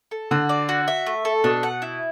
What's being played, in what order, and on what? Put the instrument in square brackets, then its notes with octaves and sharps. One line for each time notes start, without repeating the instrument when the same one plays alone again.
[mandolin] A4
[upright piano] D3 [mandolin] F#4
[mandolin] D5
F#4
E5
A3
A4
[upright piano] B2 [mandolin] D4
[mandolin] F#5
E4